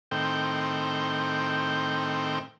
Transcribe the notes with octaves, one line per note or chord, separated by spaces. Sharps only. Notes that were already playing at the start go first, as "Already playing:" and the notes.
A2 D#3 C4 G5